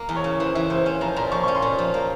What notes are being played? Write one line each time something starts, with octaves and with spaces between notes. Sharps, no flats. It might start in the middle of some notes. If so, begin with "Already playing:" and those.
Already playing: A#3
E2
C#5
C#3
E3 C5
E3 E5
C#3 C5
C#4 C5
F3 A#5
A#2 A#5
F3 C#6
C#4 C#6
C6
A#2
F3
A#3